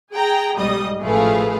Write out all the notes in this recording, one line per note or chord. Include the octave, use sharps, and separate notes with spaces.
G#4 G5 A#5
B1 G#2 G3 D#5 D#6
A1 F3 A3 G#4 B4 F5